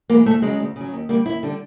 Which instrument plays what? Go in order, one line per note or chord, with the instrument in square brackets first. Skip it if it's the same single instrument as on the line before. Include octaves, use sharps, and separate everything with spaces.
[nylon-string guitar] E3 G#3 A#3
D2 A3
C#3 F#3 G#3
D2
C#3 F#3
D#2
D3 G3 A#3
D#2 E4
D3 G3